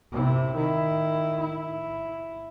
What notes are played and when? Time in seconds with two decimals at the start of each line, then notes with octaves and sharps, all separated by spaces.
0.12 C3 E4
0.55 D#3 E4
1.40 E4